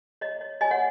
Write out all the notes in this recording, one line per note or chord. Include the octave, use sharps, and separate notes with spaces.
C#5 D#5
C#5
C#5 D#5 G#5
C#5 F#5